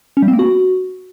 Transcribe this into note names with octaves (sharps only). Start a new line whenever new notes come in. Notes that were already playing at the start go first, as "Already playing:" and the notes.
C#4
G3
C4
A#3
F#4